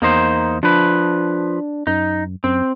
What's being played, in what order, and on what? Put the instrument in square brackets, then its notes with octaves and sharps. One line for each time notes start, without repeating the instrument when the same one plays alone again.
[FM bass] E2 [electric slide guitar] A#3 D#4 C5
[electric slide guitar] F3 B4 [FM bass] D4
[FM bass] F#2 [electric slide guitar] D#4
[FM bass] F#2 [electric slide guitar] C4